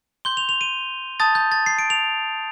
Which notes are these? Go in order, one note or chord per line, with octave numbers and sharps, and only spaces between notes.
C6 G6 G7
F7
F7
D#7
A5 D#6 G6 A6
G6
A6
C7
D7
F7